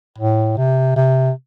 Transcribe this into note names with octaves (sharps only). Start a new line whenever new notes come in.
A2
C3
C3